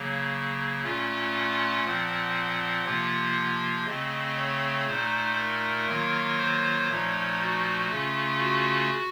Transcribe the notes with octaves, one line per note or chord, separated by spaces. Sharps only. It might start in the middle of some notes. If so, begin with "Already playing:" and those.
Already playing: C#3 F#3 A#3
A#2 A3 C#4 F4
F#5
A#2 F3 C4
C3 F3 A#3 F4
C#3 A3 C4 D#5
C#5
A#2 A3 D#4 C5
A#4
D#3 F#3 A#3 F4
C5
A#2 F3 A3 D#4 C#5
F#4
C#3 A3 C#4 F4
F#4